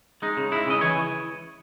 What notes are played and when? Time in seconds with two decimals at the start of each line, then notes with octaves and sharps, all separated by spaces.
0.22 G#3 D#4
0.37 C#3
0.52 G#3 E4
0.67 C#3 D#5
0.81 E3 C#5